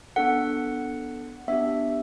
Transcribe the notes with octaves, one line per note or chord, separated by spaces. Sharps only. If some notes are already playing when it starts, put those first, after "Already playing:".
B3 D4 A4 F#5
B3 D4 G4 E5